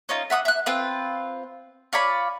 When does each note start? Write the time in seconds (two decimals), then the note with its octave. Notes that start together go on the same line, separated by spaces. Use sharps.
0.09 C#4 D#4 F4
0.30 E5 F#5 C6 D#6
0.45 E5 F#6
0.66 C4 F4 B4
1.93 F4 C#5 D5 B5